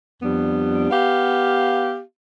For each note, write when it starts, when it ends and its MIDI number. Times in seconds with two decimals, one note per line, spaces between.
0.22 0.88 41
0.22 0.88 55
0.22 0.88 59
0.22 0.88 62
0.91 1.99 59
0.91 1.99 67
0.91 1.99 77